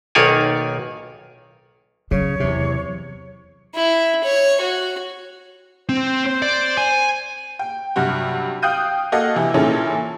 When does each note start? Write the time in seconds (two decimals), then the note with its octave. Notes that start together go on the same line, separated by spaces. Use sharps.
0.15 B1 D#3 A#3 C#5 D5 G#5
2.11 C#3 F#3 C#5
2.40 E2 C3
3.75 E4
4.24 C#5
4.61 F#4
5.89 C4 C5
6.42 D5
6.77 G#5
7.59 G5
7.96 G2 C3 F#3 F#4
8.62 F5 G5 D#6 F#6 G6 D#7
9.12 A#3 F#4 A4 D#5 F5 F#5
9.36 C3 E3
9.54 A#2 E3 C#4 D#4 G#4 A4